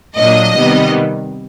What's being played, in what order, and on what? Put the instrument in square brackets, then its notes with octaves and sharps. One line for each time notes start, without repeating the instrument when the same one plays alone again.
[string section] A#2 F#3 A#3 D4 D#5
C3 D#3 G3 B3